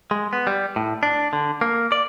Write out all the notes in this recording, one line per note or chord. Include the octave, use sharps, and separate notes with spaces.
G#3
B3
G3
A2
D4
D3
A#3
D5